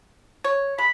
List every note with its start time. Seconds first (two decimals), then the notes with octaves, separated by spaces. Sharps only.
0.44 C#5
0.78 G#3 B5